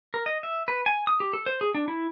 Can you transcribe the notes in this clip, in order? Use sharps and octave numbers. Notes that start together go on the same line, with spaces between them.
A#4
D#5
E5
B4
G#5
D#6
G4
A4
C5
G#4
D4
E4